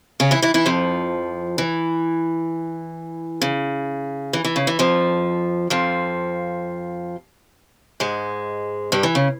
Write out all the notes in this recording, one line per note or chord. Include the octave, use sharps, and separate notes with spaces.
C#3 C#4
E3 E4
E3 E4
E3 E4
F2 F3
E3
C#3
E3
E3
C#3
E3
F2 F3
F2 F3
G#2 G#3
G2 G3
E3
C#3